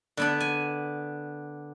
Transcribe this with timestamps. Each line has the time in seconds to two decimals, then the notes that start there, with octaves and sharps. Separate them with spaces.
0.17 D3 B3 D4
0.40 G#5